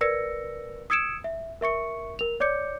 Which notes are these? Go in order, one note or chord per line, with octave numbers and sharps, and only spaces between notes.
A#4 B4 D5 E6 A#6 C#7
D#6 E6 G#6 C#7 D7 E7
E5
A#4 E5 C#6 C#7
A#4 F7
C#5 D5 D6 G6 C#7